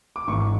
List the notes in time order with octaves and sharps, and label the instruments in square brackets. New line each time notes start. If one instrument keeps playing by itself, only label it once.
[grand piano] D6
G#1 G#2 E3 C#6